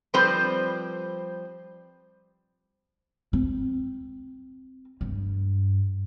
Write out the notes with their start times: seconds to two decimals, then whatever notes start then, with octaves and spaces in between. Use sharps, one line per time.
0.14 F3 G3 C4 B4 C5
3.33 C4
5.01 G2